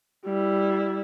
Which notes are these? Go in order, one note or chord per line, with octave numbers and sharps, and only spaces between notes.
G3 E4